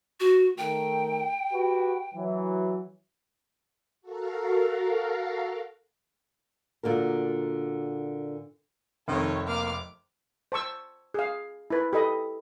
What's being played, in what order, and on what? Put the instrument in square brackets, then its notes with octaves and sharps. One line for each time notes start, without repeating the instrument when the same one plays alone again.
[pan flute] F#4
[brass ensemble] D#3 A3 A#4 [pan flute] G5
[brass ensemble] F#4 G4 B4
E3 F#3
[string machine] F#4 A4 A#4 F5
[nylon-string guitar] A#2 D3 F#4 A#4
[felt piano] F1 C4 [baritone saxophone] D#3 [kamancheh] A4 C#5
[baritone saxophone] A#3 [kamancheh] D6 F6
[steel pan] C5 A5 C#6 E6
G#4 F5
E4 B4
G4 A4 D#5 B5